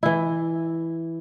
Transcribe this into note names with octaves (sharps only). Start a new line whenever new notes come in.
E3 E4